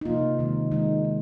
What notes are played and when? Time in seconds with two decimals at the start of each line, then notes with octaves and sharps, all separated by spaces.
0.01 D#4
0.05 C3 F3 A#3 F4
0.39 C3 D#3 G#3
0.72 D#3 G#3 D#4
1.05 D#3